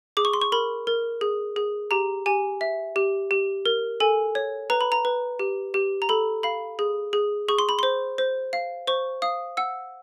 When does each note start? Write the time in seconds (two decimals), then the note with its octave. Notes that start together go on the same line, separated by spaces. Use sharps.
0.17 G#4 D6
0.25 C#6
0.33 C6
0.41 C#6
0.52 A#4 B5
0.87 A#4
1.21 G#4
1.56 G#4
1.91 G4 A#5
2.26 G4 G#5
2.61 E5
2.96 G4
3.31 G4
3.66 A#4
4.00 A4 G#5
4.35 C#5
4.70 B4 A#5
4.81 B5
4.92 A#5
5.05 B4
5.39 G4
5.74 G4
6.02 A#5
6.09 A4 B5
6.43 F5 B5
6.79 G#4
7.13 G#4
7.49 G#4 C#6
7.59 C6
7.69 B5
7.79 C5 C6
8.18 C5
8.53 F5
8.87 C5 C#6
9.22 F5 D#6
9.57 F#5 E6